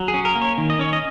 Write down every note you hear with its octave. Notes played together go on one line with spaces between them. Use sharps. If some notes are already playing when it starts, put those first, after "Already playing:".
Already playing: F#3
G#4
C#4
A#4
A#3
C#5
D#3
D#5
C#4 C#5
D#5